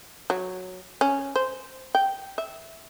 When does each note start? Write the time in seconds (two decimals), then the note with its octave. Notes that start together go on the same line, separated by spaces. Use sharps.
0.30 F#3
1.01 C#4
1.36 C5
1.95 G5
2.38 E5